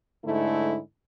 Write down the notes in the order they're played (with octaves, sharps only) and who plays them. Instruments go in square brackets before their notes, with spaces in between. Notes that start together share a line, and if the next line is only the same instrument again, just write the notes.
[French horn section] G#2 D3 A3 E4